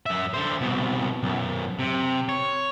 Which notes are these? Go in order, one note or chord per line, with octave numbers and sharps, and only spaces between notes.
F#2 E5
D3 C5
C2 B2
B1 F#2
C3
C#5